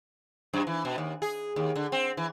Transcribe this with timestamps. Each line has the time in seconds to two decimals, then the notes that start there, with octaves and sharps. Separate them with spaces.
0.53 F#2
0.67 E3
0.85 B2
0.98 D#2
1.22 G#4
1.56 D#2
1.76 D3
1.92 C4
2.17 E3